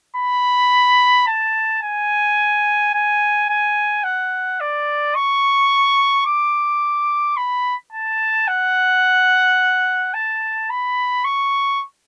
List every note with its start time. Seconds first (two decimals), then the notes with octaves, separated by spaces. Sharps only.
0.16 B5
1.27 A5
1.82 G#5
2.94 G#5
3.49 G#5
4.04 F#5
4.60 D5
5.15 C#6
6.26 D6
7.37 B5
7.92 A5
8.47 F#5
10.14 A5
10.70 B5
11.24 C#6